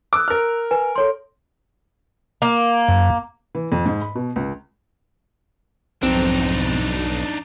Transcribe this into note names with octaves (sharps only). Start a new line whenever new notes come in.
D6 E6 F#6
A#4 F6
B4 G#5
A4 C#5 C6
A#3
F#2
E3
F2
G#2
B5
B2
C#2
B1 F2 G#2 C4 D4 D#4